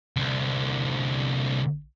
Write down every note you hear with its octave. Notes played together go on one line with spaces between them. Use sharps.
C2 D3